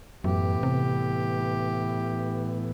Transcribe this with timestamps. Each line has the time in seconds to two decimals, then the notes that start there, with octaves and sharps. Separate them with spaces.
0.24 F#2 A2 E3 B3 G4
0.63 C3